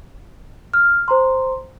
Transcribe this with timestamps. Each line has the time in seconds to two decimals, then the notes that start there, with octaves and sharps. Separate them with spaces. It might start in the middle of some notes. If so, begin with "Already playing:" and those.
0.74 F6
1.08 C5 A#5 C6